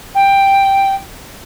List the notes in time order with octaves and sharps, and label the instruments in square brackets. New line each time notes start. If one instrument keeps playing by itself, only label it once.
[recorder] G5